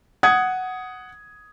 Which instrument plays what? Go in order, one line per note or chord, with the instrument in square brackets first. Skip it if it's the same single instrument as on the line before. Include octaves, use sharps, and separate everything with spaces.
[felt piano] F#5 D#6 G#6